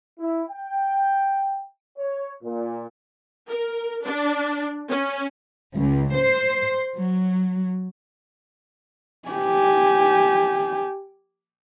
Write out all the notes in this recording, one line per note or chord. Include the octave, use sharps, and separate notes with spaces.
E4
G5
C#5
A#2
A#4
D4
C#4
C#2
C5
F#3
G4 G#5